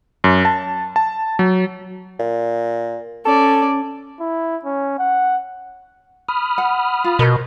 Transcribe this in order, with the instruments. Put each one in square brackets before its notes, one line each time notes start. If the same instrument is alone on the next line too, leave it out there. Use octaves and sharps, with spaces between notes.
[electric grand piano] F#2
A5
A5
F#3
[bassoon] A#2
[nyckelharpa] C#4 D5 [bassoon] A4
[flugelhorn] E4
C#4
F#5
[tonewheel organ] B5 D#6 F6
[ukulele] F#5
F4
[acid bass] B2 [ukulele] A#4 C5